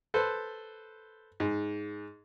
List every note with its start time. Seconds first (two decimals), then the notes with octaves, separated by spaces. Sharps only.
0.14 A4 B4 C5
1.40 G#2